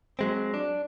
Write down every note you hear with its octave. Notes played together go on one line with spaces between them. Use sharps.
F#3 G#3 C4
D4